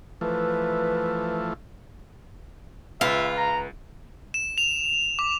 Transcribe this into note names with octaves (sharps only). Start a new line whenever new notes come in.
E3 F3 A3 B4
C#2 F4 B4 E5
A#5
E7
F7
D6